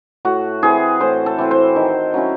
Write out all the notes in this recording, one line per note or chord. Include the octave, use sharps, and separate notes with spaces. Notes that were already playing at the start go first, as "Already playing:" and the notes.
A2 F#4
E3 C4 G#4
A2 C5
A4
E3 C4
C5
D#3
F#3 C#4 E4